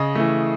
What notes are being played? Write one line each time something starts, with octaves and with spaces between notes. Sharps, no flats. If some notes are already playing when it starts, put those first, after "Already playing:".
Already playing: C#3 D#5
E3 A3